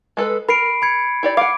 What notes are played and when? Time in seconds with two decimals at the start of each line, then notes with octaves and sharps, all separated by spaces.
0.17 G#3 A4 B4
0.49 A#4 B5 C7 D7
0.82 B5 G#6 C#7
1.23 E4 G4 D5
1.37 F5 F#5 D6 D7